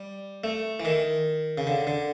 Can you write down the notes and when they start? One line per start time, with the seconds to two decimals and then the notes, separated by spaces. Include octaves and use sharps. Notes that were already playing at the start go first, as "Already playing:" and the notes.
Already playing: G3
0.44 A3
0.80 E3
0.85 D#3
1.58 C#3
1.67 D3
1.87 D3